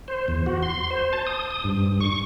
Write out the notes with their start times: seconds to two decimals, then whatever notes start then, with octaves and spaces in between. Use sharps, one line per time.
0.08 C5
0.28 E2
0.46 F#4
0.63 C6
0.90 C5
1.13 A5
1.27 D#6
1.51 D#6
1.64 G2
2.01 C#6